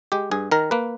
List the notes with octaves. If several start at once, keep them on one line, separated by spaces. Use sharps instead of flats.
G#3 G4
G2 G#4
D#3 A#4
A#3 B4